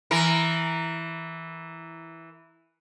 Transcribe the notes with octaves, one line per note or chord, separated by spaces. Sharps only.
E3 A#4